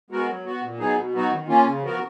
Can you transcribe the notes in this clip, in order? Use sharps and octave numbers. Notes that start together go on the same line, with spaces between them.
G#3 B3 F#4 A#4
F#3
B3 F#4
A#2
F#3 B3 D#4 G#4
B2
F#3 B3 D#4 F#4
D#3
A#3 C#4 F4
C#3
F3 B3 F#4 A#4